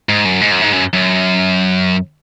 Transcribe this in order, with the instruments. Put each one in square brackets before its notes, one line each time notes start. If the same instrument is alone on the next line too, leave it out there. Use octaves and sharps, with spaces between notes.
[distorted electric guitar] G#2
F#2
G#2
F#2
G#2
F#2
F#2